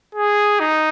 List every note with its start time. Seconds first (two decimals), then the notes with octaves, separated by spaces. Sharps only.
0.15 G#4
0.60 D#4